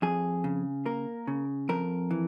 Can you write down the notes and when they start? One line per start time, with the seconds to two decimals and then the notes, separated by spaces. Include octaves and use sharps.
0.02 F2 G#4
0.44 C#3
0.86 A#3 A#4
1.27 C#3
1.69 F2 A#4
2.11 E3